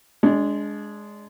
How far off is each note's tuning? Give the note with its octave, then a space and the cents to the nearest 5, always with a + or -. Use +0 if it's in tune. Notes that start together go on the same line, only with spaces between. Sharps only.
G#3 +0 D4 -25